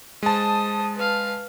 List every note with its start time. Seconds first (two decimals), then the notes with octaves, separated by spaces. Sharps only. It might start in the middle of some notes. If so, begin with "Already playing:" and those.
0.23 G#3 C5 A5 D#6
0.96 B4 F5